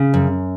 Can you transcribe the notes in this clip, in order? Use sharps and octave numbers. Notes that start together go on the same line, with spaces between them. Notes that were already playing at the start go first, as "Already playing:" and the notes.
Already playing: C#3
F#2